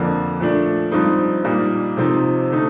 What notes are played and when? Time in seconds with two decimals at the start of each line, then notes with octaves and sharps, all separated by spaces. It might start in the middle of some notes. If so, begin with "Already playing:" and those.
Already playing: F2 D3 F3 A#3 D4
0.40 A#2 F3 A3 D4
0.92 G2 F3 C4 D#4
1.44 A#2 G3 A#3 D#4
1.97 C3 F3 C4 D#4
2.50 D3 A3 D#4